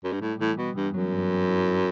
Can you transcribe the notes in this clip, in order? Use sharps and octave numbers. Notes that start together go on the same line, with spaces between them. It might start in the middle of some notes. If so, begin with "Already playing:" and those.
F#2
G2
A2 G3
A2 E3
B2 B3
G2 E3
F#2 F#3
G2
C4
E4
C4